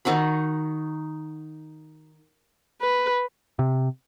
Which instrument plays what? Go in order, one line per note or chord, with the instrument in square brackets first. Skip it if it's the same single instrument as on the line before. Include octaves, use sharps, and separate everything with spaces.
[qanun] D#3 D#4 F#4 B5
[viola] B4
[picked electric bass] C3